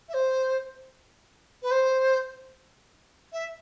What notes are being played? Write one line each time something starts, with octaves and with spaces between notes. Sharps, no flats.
E5
C5
B4
C5
E5